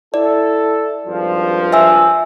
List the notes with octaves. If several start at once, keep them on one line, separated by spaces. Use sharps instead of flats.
E4 A4 D5
G#1 G2 F3
E5 G#5 E6